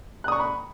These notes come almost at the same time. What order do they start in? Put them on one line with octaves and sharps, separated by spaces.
F#6 D#6 C#6 A#5 B5